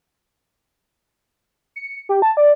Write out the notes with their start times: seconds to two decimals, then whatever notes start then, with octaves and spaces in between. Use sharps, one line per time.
1.76 C#7
2.09 G4
2.22 A5
2.37 D5